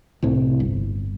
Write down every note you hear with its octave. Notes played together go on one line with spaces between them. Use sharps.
C2 A2 C3
G1